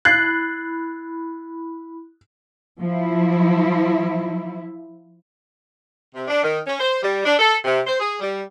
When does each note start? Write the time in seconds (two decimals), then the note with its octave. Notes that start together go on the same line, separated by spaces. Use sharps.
0.05 E4 B5 F#6 G#6 A6 C7
2.81 F3 E4
6.14 C3
6.28 D4
6.43 D#3
6.66 C#4
6.79 C5
7.03 G3
7.24 D4
7.39 A4
7.65 C3
7.87 C5
8.00 G#4
8.20 G3